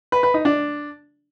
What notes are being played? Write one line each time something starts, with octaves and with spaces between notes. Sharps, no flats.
B4
B4
D#4
D4